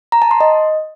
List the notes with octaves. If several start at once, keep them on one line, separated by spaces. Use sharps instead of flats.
A#5
A5
C6
D#5